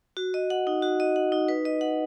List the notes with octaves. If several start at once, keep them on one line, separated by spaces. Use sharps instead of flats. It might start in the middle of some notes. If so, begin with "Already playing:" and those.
F#4
D#5
F#5
D#4
F#4
D#5
F#5
D#4
B4
D#5
F#5